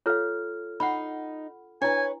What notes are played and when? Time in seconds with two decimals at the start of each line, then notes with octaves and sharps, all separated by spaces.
0.06 F4 A4 C#5 F5 F6
0.80 D#4 F#5 B5
1.82 D4 E4 B4 C#5 G#5